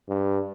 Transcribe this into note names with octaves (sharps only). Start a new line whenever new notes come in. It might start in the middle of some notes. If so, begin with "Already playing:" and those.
G2